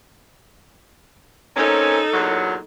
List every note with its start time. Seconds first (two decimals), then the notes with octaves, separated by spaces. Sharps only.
1.56 A#3 C4 C#4 D#4 A4
2.14 E2 A#2 F#3